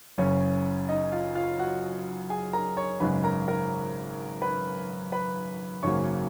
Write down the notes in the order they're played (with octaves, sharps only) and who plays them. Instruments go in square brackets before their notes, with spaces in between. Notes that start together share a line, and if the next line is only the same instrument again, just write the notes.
[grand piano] F#1 F#2 C#3 C#4 C#5
D#4 D#5
F4 F5
F4 F5
F#4 F#5
G#4 G#5
A#4 A#5
C#5 C#6
G#1 F#2 C#3 G#3 B4 B5
A#4 A#5
A#4 A#5
B4 B5
B4 B5
G#1 F#2 C#3 F#3 A#3 C#5 C#6